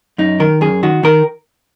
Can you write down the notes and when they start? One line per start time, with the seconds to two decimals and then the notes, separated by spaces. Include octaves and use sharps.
0.18 F#2 D#4
0.40 D#3 A#4
0.61 F#2 G#4
0.83 D#3 F#4
1.04 D#3 A#4